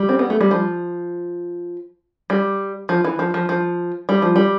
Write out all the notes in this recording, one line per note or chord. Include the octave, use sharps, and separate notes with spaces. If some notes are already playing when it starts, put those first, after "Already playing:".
Already playing: G3
C4
B3
A3
G3
F3
G3
F3
E3
F3
F3
F3
G3
F3
G3